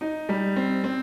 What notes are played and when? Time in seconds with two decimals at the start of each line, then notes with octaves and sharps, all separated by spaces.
0.01 D#4
0.29 G3
0.56 C4
0.84 C4